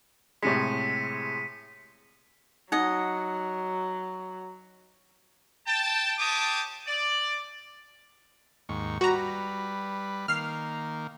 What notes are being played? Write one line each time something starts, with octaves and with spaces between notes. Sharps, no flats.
A2 C3 G#3 B6 C#7 D#7
F#3 D#4 D#5 F#5
G5 A5
F4 G4 C#5 A5 D6 D#6
D5
D#2 G#2 C#6
G3 F#4 B4 A#5
D#3 A#3 F6 C7